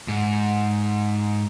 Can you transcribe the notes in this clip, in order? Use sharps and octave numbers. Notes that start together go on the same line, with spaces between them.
G#2